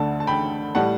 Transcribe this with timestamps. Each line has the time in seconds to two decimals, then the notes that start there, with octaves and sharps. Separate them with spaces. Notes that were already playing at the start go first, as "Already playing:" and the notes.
Already playing: D2 D3 A3 A5
0.20 A5
0.27 G5 B5
0.75 A2 G3 F#5 A5